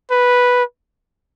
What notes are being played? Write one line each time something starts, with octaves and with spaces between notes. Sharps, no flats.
B4